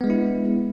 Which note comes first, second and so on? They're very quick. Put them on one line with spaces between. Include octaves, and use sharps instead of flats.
B3 G#3 D4 E4